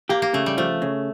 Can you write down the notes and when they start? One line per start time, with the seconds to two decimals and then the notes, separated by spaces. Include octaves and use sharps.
0.09 A#3 G4
0.22 A#3
0.34 C#3 A3
0.46 G3
0.57 F3 A3
0.82 C#3